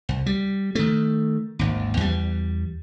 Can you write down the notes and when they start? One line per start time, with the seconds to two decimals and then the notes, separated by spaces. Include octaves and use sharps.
0.09 C2
0.26 G3
0.75 D#3 A3
1.59 G#1 D#2
1.97 E2 G3